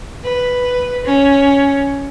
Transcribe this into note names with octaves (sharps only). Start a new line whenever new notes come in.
B4
C#4